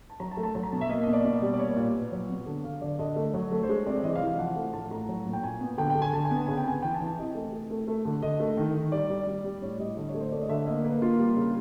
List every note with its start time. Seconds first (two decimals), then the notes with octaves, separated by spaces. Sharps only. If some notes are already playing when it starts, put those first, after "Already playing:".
0.10 A5
0.20 F#3 A#5
0.31 A5
0.37 A3
0.43 A5
0.55 F#3 A5
0.63 A#5
0.72 B2 A5
0.81 E5
0.89 A#3 D#5
1.03 B2 D#5
1.13 D5
1.25 B2
1.42 G3
1.53 D5
1.59 A#3 C#5
1.77 A#2
1.94 A#2 B4
2.12 F#3
2.29 B3
2.46 D3
2.64 D3 F5
2.81 D3 D5
2.99 D3 D#5
3.16 A3
3.34 F#3
3.52 A3
3.63 C5
3.69 G#3 C#5
3.86 C3 D5
4.03 E3 D#5
4.15 F5
4.21 E3
4.27 F5
4.39 F3 F#5
4.56 A3
4.73 A2 A5
4.91 A3 A#5
5.09 F#3
5.26 A#2
5.33 G5
5.44 A#2 G#5
5.61 B3
5.78 D3 G5
5.90 G5
5.95 D3
6.02 G#5
6.13 D3 A5
6.25 G#5
6.31 B3
6.36 A5
6.47 C#3 G#5
6.57 G5
6.66 B3 G#5
6.82 E3 G5
6.90 G#5
6.94 A5
7.00 E3
7.06 A5
7.18 C3 D#5
7.35 A3
7.53 A3
7.70 A3
7.88 A3
8.05 D3
8.22 D3 D#5
8.40 A3
8.57 D#3
8.75 D#3
8.92 G3 D5
9.10 G3
9.27 G3
9.44 G3
9.62 A2 C#5
9.79 G3 D#5
9.97 D3 D#5
10.09 C#5
10.14 A3
10.20 C5
10.32 A3 D5
10.41 D#5
10.49 D3 E5
10.67 A#3 D#5
10.84 A#3 B4
11.02 A#3 F4
11.19 G3
11.37 C#3